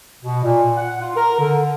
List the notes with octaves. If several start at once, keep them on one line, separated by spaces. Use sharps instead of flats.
B2
A#2
F#5
F4
A#4
D3